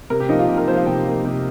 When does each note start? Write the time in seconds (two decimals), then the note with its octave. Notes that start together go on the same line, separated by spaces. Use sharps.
0.10 C3 A#4
0.20 G4
0.29 F3 A#3 D#4
0.39 F4
0.48 C3 G4
0.57 A#4
0.68 F3 A#3 C5
0.77 F5
0.86 C3 G5
1.05 F3 A#3
1.25 C3